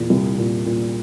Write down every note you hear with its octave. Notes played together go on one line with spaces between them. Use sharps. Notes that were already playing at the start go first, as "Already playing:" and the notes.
Already playing: E2 A#2
C2
A#2
A#2